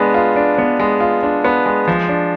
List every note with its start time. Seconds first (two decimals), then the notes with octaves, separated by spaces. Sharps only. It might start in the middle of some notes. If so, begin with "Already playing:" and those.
Already playing: G#3 B3 D4
0.14 F4
0.36 D4
0.58 B3
0.80 G#3
1.00 F4
1.23 D4
1.45 B3
1.66 G#3
1.88 F3
2.09 D4